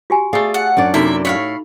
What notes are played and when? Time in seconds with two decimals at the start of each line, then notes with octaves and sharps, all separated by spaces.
0.10 F#4 G4 G#5
0.33 A3 G#4 D5 F5
0.54 F#5
0.77 F#2 D4 D5
0.94 C3 A#3 D#4 E4 F#4 A4 E5
1.25 A2 C#5 F5 F#5 B5